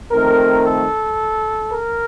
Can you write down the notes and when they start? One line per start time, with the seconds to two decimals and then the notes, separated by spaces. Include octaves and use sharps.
0.11 F2 D#3 A3 C4 A#4
0.65 A4
1.72 A#4